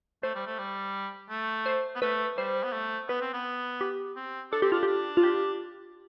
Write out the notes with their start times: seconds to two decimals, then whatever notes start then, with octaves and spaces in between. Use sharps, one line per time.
0.23 A3 C5
0.35 G3
0.47 A3
0.58 G3
1.30 A3
1.66 C5
1.95 B3
2.02 A3 B4
2.37 G3 C5
2.63 B3
2.73 A3
3.09 B3 B4
3.21 C4
3.33 B3
3.81 G4
4.16 C4
4.52 D4 A4
4.62 C4 G4
4.72 D4 F4
4.83 D4 G4
5.17 F4
5.23 G4